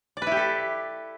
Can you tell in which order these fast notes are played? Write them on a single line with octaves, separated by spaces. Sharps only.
D5 B4 E4 G4 A4